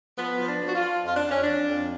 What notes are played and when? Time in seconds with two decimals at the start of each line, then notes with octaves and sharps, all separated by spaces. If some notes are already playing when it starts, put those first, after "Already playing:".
0.17 F3 B3
0.39 F3
0.47 D4
0.60 F3
0.67 F#4
0.75 F4
0.82 F3
1.03 F2 F4
1.17 D4
1.26 F2 C#4
1.41 D4
1.48 F2
1.69 F2